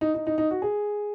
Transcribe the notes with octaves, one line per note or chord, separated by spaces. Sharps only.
D#4
D#4
D#4
D#4
F#4
G#4